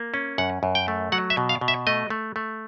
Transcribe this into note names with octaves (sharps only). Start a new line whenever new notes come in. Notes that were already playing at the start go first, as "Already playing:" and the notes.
Already playing: A#3
C#4
F#2 F#5
F#2
G5
A3
F#3 F#5
E5
B2
F5
B2
E5
A3 D#5
A3
A3